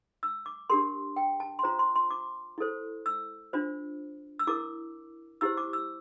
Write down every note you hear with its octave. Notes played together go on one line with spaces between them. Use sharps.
E6
D6
D4 G4 A#4 C6
G5
A5
C6
F4 C5 A#5
C6
C6
D6
E4 A4 C5
E6
D4 F4 C5
E6
E4 A#4 D6
E4 G4 C5 E6
D6
E6